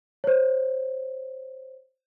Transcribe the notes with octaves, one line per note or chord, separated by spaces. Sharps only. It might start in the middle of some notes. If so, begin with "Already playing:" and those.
C5 C#5